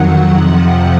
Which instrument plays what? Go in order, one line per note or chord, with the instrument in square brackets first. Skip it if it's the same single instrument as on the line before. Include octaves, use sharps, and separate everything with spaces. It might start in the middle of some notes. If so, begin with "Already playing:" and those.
Already playing: [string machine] F2 D#3 F#3 F#5
F2 C3 F3